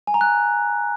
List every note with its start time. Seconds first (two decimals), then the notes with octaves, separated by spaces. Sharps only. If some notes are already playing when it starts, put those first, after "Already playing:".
0.07 G#5
0.14 A#5
0.21 F#6